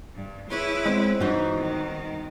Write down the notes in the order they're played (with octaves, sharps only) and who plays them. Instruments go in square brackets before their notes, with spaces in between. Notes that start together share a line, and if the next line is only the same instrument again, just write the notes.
[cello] G2
[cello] E4 B4 [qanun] G#4 C#5 C6
[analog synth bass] G#3 [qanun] B3 C4
[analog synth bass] G2 [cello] E3 [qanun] D#4 F#4
[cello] D#3